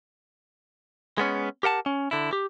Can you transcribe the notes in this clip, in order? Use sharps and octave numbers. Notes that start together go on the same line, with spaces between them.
G#3 B3 C#4
G4 A#4 F#5 A5
C#4
D3 E4
G4